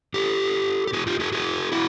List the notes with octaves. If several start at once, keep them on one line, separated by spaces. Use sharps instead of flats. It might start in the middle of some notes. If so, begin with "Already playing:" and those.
G4 A4
G4
F#4 G#4
F4 G4
F#4 G#4
F#4 G#4
E4 F#4